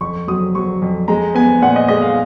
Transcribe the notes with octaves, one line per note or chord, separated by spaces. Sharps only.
F2 C#6
F#3 D#6
F#3 C#6
F2
G#3 A#5
B3 G#5
A#2 F#5
D#5
G#3 D#5
F5